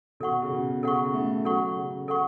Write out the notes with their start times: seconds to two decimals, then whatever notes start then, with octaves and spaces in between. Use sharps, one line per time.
0.20 B2 A4 F#5 C#6
0.42 C#3
0.52 B2
0.83 C#3 A4 F#5 C#6
1.14 A3
1.45 F#3 A4 F#5 C#6
1.77 C#3
2.08 A4 F#5 C#6